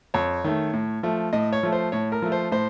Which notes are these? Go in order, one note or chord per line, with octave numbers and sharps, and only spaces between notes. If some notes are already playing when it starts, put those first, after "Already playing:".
F2 C#5
D#3 A3
A2
F3 A3
A2 D#5
C#5
F3 A3
C5
A2 C#5
A#4
F3 A3
C5
A2 C5